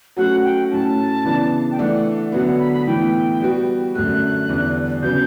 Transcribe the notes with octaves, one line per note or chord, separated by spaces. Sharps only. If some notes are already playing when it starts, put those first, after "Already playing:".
F#3 A3 C#4 F#4 C#5 F#5
G5
A2 F#3 C#4 A5
C#3 E3 B3 D4
G5
E3 A3 D4 F#5
D3 F#3 B3 F#5
F#5
B5
B5
A2 E3 B3 G5
G3 B3 F#4
F#2 D3 A3 F#6
E2 D3 G3
C#3 F#3 B3 G6